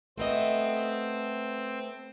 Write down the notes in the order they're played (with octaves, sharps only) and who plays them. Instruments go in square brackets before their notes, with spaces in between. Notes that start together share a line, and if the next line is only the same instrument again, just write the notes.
[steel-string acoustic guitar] A3 B3 D#5 [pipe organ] C4